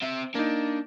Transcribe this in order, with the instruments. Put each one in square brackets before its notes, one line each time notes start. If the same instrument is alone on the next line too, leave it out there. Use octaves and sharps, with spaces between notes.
[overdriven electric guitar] C4 E5
[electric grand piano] A#3 D#4 [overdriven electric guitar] D4